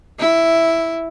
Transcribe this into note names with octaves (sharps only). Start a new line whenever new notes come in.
E4